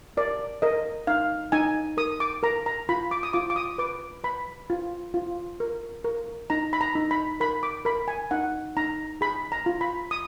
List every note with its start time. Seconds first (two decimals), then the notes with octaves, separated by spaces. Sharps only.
0.17 A#4 D5
0.62 A#4 D#5
1.07 D#4 F5
1.52 D#4 G#5
1.97 A#4 D#6
2.20 D6
2.43 A#4 A#5
2.66 A#5
2.89 F4 B5
3.11 D6
3.23 D#6
3.33 F4 D6
3.50 D6
3.56 D#6
3.78 B4 D6
4.24 B4 B5
4.70 F4
5.14 F4
5.60 A#4
6.04 A#4
6.50 D#4 A#5
6.73 B5
6.81 A#5
6.95 D#4
7.11 B5
7.40 A#4 B5
7.63 D6
7.85 A#4 B5
8.08 G#5
8.31 D#4 F#5
8.77 D#4 A#5
9.21 G#4 B5
9.52 A#5
9.66 F4
9.81 B5
10.11 D#6